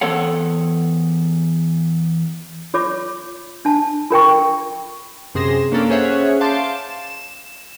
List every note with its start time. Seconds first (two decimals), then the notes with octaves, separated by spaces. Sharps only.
0.01 E2 C4 A4 C#5 F#5
2.74 F4 C#5 D6
3.65 D4 A5
4.10 F4 A#4 G5 C#6
5.35 F#2 C3 G#4 C6 A#6 E7
5.72 A#3 C#4 D4 A4 A#4
5.90 C#4 G#4 C5 C#5 E5 F#5
6.41 F5 A5 C6 D6 G6 A6
6.75 E7